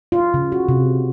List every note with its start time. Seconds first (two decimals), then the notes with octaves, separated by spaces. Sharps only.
0.12 F4
0.34 C#3
0.52 F#4
0.68 C3